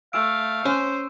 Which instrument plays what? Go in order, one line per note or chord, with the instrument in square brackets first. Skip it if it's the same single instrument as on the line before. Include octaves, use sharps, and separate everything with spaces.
[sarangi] A3 [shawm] F5 [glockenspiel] E6 D7
[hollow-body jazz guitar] C#4 [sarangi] C5